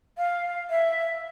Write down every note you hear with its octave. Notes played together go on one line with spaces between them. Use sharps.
F5
E5